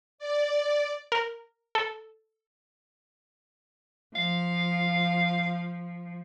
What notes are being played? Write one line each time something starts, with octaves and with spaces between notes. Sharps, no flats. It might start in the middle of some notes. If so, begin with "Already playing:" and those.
D5
A#4
A4
F3 F5